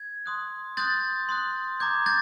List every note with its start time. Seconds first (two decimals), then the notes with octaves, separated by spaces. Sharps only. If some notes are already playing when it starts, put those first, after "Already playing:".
Already playing: G#6
0.26 C6 D#6 F#6
0.77 C6 D#6 F#6 G6 A6
1.29 C6 D#6 F#6
1.80 A#5 D6 G6 G#6
2.06 G6 A6